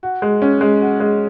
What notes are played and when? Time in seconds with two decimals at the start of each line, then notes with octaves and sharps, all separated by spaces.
0.03 F#4
0.22 G#3
0.42 C#4
0.61 G#3
0.81 F#4
1.00 G#3